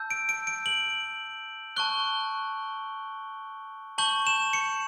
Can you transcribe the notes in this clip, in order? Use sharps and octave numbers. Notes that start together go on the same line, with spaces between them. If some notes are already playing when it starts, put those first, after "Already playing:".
Already playing: A5 E6 G6
D7
D7
D7
F#7
A5 C#6 F#6 G7
A5 C#6 G6 F#7
E7
C#7